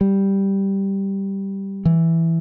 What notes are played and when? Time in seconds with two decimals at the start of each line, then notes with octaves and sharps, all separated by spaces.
0.01 G3
1.85 E3